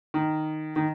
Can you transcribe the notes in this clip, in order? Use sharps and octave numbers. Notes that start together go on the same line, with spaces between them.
D#3
D#3